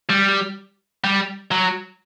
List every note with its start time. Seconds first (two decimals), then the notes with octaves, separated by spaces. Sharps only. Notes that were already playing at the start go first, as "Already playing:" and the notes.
0.10 G3
1.04 G3
1.51 F#3